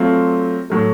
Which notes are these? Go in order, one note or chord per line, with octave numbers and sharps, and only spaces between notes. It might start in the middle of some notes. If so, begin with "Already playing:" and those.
Already playing: F#3 A3 C4 F4
A2 F#3 A3